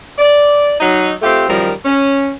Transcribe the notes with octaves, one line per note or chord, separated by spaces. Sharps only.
D5
F#3 D#4
A3 C4 F4 G4
F#2 D#3 F3 G3 A#4
C#4